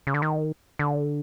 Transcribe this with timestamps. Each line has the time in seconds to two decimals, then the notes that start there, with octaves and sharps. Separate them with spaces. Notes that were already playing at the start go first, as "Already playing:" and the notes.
0.07 C#3
0.14 D3
0.22 D#3
0.79 D3